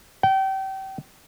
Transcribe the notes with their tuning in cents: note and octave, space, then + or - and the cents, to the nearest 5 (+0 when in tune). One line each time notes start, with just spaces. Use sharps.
G5 -30